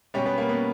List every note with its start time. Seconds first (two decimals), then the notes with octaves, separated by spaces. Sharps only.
0.14 B2 G3 C#4
0.26 B3
0.38 A#3
0.49 B3